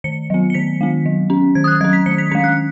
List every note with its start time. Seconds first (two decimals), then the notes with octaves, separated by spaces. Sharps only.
0.04 D#3 C#7
0.30 F#3 B3
0.50 C#7
0.54 D#3 B6
0.81 G#3 B3
1.06 F#3
1.30 C#4
1.55 D#3 G#6
1.64 D#6
1.67 F#6
1.81 F#3 C#4 G#6
1.93 B6
2.06 D#3 C#7
2.18 B6
2.31 G#3 C#4 B6
2.44 F#6